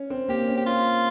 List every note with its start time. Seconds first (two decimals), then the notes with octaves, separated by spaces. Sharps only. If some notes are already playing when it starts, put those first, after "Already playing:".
Already playing: C#4
0.10 C4
0.28 A#3 G4
0.47 C#4
0.57 G4
0.66 C#4 F4